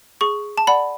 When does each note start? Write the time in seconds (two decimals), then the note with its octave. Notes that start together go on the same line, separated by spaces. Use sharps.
0.21 G#4 C#6
0.58 A5
0.67 D5 F#5 B5